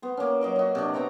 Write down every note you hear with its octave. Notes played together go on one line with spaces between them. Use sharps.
B3 C5
A#3 C#4
F#3 D#5 D6
F#4 D#5
C3 D4
B3 C4 C#5 A#5